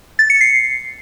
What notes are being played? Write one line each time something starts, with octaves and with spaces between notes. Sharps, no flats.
A6
C#7
C7